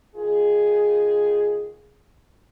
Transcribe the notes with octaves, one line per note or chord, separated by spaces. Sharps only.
D#3 F4 G#4